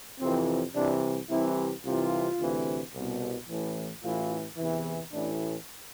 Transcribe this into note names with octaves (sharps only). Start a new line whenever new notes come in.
F2 C3 E3 C4
C2 C3 E3 D4
C2 C3 E3 E4
C2 C3 E3 F4
D2 C3 E3
C2 B2
A1 A2 E3
A1 A2 E3 F4
E2 C3 E3
A1 A2 E3 D4